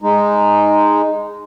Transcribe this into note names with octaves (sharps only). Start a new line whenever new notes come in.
G#3 D#4